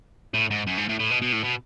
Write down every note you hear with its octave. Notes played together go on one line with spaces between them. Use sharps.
A2
G#2
F#2
G#2
A2
A2
B2
B2
A2
B2